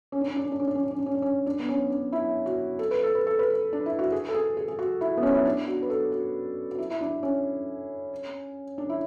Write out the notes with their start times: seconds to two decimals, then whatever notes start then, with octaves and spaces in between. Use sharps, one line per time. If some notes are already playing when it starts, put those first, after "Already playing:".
0.12 C#4
0.21 D4
0.28 C#4
0.36 D4
0.44 C#4
0.52 D4
0.60 C#4
0.67 D4
0.75 C#4
0.83 D4
0.91 C#4
0.99 D4
1.06 C#4
1.15 D4
1.22 C#4
1.46 D4
1.59 B3
1.69 C#4
1.90 D4
2.12 E4
2.46 F#4
2.79 A4
2.91 B4
3.03 A4
3.15 B4
3.27 A4
3.39 B4
3.50 A4
3.73 D4
3.86 E4
3.99 F#4
4.12 G#4
4.29 A4
4.34 G#4
4.57 G#4
4.68 G#4
4.79 F#4
5.01 E4
5.17 B3
5.23 C#4
5.34 E4
5.45 D4
5.68 F#4
5.83 B4
5.90 A4
6.12 F#4
6.71 F#4
6.78 E4
6.90 E4
7.01 D4
7.23 C#4
8.78 D4
8.89 E4